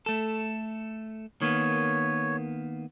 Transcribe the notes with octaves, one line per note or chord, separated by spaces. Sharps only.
A3 A4
D#3 A#3 B3 C#5